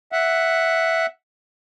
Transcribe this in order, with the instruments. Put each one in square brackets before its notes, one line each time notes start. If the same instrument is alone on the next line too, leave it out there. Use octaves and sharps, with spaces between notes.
[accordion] E5 F#5